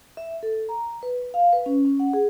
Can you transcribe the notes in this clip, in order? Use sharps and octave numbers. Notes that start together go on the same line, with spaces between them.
E5
A4
A#5
B4
F5
B4
C#4
C#4
F#5
G#4